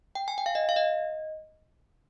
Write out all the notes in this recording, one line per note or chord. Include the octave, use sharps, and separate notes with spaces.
G5
G#5
G5
F5
D#5
F5
D#5